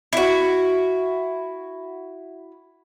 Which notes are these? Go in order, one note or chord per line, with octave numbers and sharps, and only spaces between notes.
E4 F#4